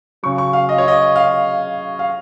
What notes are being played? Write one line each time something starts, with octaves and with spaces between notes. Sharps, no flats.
C#3 F#3 C#6
C#6
F5
D#5
C#5
D#5
F5
F5